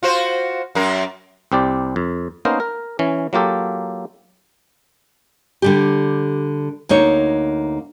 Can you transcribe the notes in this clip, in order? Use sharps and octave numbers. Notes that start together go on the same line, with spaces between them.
F4 F#4 C5
F#2 A#4
C2 C4 G4 D5
F2
A#3 B3 C#4 D#4 A#4 C5
A#4
E3 C#4
F#3 A#3 F4 G4 A4
D3 G3 G4
D2 A#3 D#4 C#5